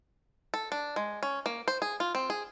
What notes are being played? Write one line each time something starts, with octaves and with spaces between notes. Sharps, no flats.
A4
D4
G#3
C#4
A#3
C5
G#4
F4
C4
G#4